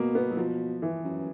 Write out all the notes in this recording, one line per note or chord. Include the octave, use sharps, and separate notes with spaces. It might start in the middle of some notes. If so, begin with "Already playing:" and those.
Already playing: B2 A#3
B3
F#3
B2 F3
E3
F#2